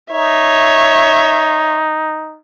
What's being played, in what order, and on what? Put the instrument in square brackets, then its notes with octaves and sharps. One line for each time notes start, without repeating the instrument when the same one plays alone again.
[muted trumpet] D#4 [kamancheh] C#5 E5